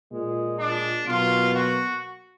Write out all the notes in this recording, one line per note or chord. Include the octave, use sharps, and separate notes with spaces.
A#2 G#3
D4
B2 F#3 A#3 F4
F#4